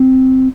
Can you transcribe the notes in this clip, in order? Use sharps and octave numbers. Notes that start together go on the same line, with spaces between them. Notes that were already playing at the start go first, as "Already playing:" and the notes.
Already playing: C4